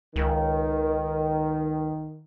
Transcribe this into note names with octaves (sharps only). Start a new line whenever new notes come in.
C#2 D#3